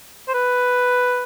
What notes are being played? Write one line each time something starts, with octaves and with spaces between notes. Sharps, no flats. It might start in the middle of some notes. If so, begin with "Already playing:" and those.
C5
B4